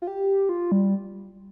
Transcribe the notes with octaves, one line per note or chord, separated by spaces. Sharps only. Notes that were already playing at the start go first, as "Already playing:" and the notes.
F4
G4
F4
G3